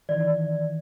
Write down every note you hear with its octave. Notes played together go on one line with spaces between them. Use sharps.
D#3 E3 D5